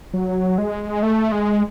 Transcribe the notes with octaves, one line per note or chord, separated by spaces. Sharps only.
F#3
G#3
A3
G#3